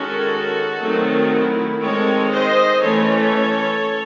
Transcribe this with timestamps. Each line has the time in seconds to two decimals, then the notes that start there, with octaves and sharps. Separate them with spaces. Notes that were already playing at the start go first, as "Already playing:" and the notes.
Already playing: D#3 G#3 C#4 F#4 A4
0.81 D#3 F#3 A3 C4
1.32 E4
1.82 D#3 G#3 C4 A4 C#5
2.32 C5 D#5
2.82 E3 A3 C#4 A4 C#5